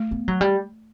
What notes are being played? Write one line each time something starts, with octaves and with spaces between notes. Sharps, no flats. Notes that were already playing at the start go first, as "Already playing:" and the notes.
Already playing: A3
B3
F#3
G3